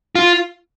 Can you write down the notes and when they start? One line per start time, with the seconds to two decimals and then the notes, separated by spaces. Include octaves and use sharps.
0.15 F4